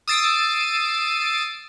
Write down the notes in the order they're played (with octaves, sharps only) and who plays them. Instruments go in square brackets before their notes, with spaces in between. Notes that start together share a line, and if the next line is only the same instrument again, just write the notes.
[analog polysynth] D#6 E6 A6 C7 D7